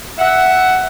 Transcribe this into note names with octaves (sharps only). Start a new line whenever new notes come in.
E5 F#5